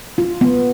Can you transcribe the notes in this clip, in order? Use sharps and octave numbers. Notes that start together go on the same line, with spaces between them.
F4
B3